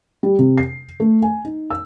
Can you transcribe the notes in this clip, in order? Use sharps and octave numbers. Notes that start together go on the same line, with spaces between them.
G3
C3
C7
A3
G#5
D#4
E6